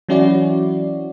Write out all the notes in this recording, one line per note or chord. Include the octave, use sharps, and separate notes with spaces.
E3 F#3 C#4 E4 F#4 D5